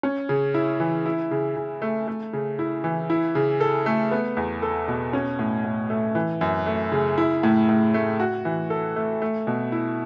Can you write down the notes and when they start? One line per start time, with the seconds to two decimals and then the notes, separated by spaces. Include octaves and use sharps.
0.03 C#4
0.29 C#3
0.54 E4
0.80 E3
1.06 E4
1.31 C#3
1.56 C#3
1.82 A3
2.07 A3
2.33 C#3
2.59 E4
2.84 E3
3.10 E4
3.35 C#3
3.61 A4
3.86 A3
4.11 B3
4.37 E2
4.62 A4
4.88 B2
5.13 C#4
5.39 A2
5.65 A2
5.90 A3
6.15 E3
6.41 F#2
6.66 A3
6.92 C#3
7.18 E4
7.43 A2
7.69 A2
7.94 A3
8.20 F#4
8.45 E3
8.70 A4
8.96 A3
9.22 A3
9.47 B2
9.72 E4